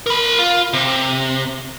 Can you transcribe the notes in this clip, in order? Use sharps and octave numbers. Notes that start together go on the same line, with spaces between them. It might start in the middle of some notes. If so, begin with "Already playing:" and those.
A#4 B5
F4
C3